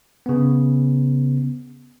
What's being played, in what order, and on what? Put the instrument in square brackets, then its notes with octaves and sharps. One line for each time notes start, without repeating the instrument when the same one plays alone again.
[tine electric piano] C#3 B3